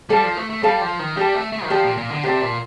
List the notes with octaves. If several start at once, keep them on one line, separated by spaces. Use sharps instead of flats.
G3 A4 D5 F5 A5
F3
A3
A3
G3 A4 D5 F5 A5
F3
D#3
G3 G4 D5 A5
A3
A3
D#3
F3 G4 D5 A5
A#2
A#2
D3
C3 G4 D5 A5
A#2